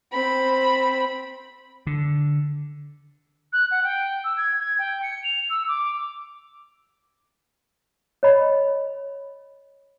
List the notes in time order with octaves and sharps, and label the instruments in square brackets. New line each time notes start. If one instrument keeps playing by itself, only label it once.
[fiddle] C4 B5
[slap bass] D3
[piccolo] F#6
F#5
G5
E6
G#6
G#6
G5
C#7
F7
E6
D6
[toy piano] C#5 D#5 B5